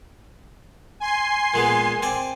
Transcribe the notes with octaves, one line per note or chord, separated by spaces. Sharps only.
G#5 C6 C7
A#2 G#3 B3
C4 D5 G#5